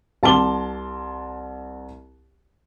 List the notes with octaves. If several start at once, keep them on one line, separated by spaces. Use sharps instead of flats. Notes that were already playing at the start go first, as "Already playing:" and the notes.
C2 A5 C6 D6 G7